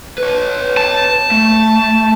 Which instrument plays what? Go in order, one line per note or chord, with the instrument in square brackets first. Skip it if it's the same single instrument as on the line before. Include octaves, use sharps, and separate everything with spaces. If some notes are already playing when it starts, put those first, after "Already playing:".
[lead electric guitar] B4 C#5
[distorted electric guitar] A5
[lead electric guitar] A3